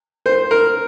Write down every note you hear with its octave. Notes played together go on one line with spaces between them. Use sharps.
C5
A#4